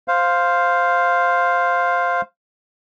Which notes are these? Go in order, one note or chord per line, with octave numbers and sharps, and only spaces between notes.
C5 F5